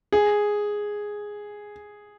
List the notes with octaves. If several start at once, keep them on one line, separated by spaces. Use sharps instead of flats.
G#4